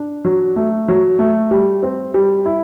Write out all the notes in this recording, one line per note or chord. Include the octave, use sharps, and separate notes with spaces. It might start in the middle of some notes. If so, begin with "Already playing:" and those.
Already playing: D4
F#3
A3
F#3
A3
G3
C4
G3
E4